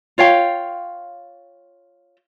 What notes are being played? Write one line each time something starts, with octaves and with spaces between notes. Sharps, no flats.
F4 C#5 F5 G5